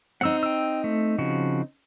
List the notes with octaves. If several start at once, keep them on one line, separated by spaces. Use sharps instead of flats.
C4 D#4 F#5 E6
G5 E6
A3
C#3 F3 F#4